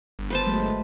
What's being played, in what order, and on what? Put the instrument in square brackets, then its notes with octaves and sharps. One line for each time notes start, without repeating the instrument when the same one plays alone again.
[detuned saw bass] G1
[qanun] B4 C5 A5
[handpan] F#3 G#3 A3